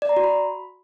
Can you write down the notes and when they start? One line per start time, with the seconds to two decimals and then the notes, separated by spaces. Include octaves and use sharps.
0.02 D5
0.09 A#5
0.17 F#4
0.24 B5